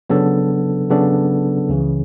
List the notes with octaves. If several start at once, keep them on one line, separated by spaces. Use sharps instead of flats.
C#3 F#3 B3 D4 A4
C#3 F#3 B3 D4 A4
C#2 C#3 E3